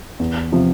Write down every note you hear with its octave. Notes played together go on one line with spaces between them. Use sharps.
E2
C3 F3